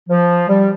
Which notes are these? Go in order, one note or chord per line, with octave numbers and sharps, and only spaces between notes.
F3
G3